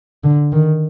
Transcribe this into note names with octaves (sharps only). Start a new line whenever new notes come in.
D3
D#3